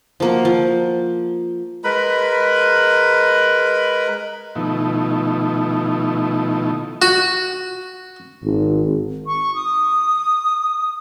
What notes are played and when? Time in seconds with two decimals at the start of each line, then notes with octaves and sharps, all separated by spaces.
0.20 F3 A#3 F#4
0.45 F3
1.84 G#3 A#4 B4 B5
4.55 B2 D#3 F3 A3 D#4 E4
7.02 F#4
8.44 G#1
9.27 C#6
9.55 D#6